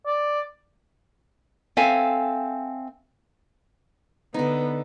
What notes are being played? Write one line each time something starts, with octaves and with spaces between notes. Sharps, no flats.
D5
C4 A4 E5 F5 G#5
D3 B3 D#4